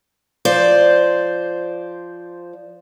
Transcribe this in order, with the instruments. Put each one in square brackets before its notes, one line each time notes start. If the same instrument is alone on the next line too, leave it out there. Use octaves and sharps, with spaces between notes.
[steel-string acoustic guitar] F3 C5 D5